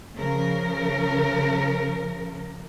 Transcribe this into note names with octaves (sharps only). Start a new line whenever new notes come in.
C#3 F3 A#4